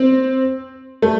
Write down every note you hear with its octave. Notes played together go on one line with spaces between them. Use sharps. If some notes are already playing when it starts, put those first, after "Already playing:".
Already playing: C4
A3